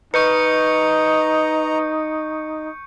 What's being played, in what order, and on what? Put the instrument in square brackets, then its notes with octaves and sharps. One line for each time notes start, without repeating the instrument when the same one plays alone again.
[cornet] D#4 [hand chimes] B4 [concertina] D#5 A#5 [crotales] C#6 G6 C#7